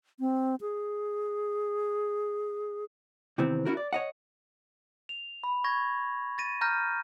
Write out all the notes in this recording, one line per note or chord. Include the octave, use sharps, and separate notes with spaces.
C4
G#4
C3 D#3 E3 B3 C4
C#4 E4 F#4 A#4
D5
C#5 D#5 F#5
F7
B5
C#6 G#6 A#6
A6 A#6 D#7
A#5 F6 G6 A#6 D#7